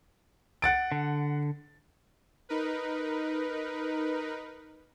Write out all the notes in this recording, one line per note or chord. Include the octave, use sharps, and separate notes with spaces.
F#5 A6 D7
D3
D#4 A#4 B4